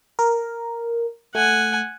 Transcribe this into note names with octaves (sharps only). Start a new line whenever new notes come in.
A#4
A3 F#5 G#5